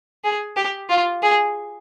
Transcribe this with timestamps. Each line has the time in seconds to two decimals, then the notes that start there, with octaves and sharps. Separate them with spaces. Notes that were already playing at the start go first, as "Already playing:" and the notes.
0.24 G#4
0.56 G4
0.90 F4
1.23 G#4